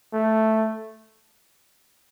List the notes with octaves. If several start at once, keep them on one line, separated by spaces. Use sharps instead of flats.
A3